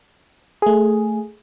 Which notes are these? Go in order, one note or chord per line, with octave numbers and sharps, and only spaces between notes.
A3 G#4